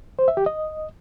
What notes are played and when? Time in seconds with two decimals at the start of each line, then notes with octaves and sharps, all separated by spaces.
0.19 C5
0.28 E5
0.37 G4
0.46 D#5